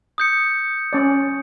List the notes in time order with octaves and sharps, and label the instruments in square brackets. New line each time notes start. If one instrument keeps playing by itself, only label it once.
[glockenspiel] D#6 G6 C#7
[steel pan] C#4 D5